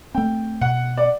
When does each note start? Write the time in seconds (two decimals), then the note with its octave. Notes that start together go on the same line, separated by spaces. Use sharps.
0.15 A3 C4 G5
0.61 B2 F#5
0.97 D5